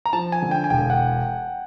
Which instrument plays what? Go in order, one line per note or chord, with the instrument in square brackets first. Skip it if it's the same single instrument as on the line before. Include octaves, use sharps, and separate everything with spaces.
[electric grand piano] A#5
[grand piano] F3 [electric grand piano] A5
[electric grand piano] G#5
[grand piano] D3
[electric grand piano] G5
G#5
[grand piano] E1 [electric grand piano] G5
[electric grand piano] F#5